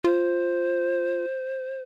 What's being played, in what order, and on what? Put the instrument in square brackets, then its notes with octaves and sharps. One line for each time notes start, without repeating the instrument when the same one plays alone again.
[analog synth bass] F4 [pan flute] C5